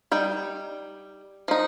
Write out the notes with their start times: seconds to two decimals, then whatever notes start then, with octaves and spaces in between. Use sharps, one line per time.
0.12 G3 D#4 G5
1.48 F3 D#4